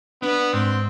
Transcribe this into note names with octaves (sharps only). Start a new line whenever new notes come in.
B3 D4
G#2 C4